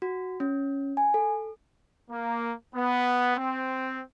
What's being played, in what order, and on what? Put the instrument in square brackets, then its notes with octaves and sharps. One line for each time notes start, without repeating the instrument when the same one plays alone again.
[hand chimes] F#4
C#4
G#5
A4
[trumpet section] A#3
B3
C4